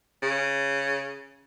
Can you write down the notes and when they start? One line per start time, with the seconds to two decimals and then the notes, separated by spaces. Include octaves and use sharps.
0.23 C#3